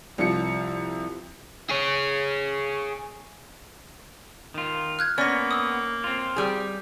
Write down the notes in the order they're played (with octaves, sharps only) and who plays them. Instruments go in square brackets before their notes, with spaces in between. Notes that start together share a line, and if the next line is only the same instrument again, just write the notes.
[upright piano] C2 F3 F4 C#7
[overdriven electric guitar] G#4 C#5
[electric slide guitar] D#3 F4
[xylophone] F6 F#6 G#6
[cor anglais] A#3 [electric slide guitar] B3 [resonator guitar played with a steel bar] C#4 [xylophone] D5 A#6
[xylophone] D#6 E6
[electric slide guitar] C4 F4
[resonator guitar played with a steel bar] G3 G#4